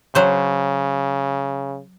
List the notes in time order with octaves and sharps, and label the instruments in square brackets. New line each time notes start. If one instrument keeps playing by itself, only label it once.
[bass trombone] C#3 [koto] F#3 C5